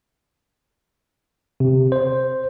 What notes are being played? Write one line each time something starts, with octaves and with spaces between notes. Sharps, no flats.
C3
C5